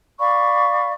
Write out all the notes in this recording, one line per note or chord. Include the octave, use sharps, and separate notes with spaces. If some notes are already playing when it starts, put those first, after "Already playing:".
D5 F5 B5 C#6